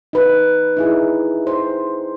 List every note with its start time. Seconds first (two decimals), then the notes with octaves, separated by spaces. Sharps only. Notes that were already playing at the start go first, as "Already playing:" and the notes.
0.13 D#4 B4
0.77 D#4 E4 G#4
1.47 C5